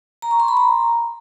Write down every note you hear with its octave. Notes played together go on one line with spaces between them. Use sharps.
A#5
C#6
C6
B5
A#5